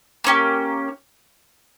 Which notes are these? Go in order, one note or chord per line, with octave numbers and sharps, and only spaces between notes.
A#3 C#4 G4